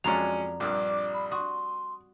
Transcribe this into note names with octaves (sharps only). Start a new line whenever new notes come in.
F2 F#3 G#3 C#4 F4 D5 A#5 F7
A#1 G2 G3 D6
B5
F#4 C6 D#6